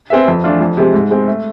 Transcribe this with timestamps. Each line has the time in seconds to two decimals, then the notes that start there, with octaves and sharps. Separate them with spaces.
0.10 C4 G#4 B4 E5
0.28 F2
0.44 E3 A3 D4 F4
0.61 F2
0.77 C3 G#3 C4
0.94 G#2
1.11 G#3 C4
1.27 A3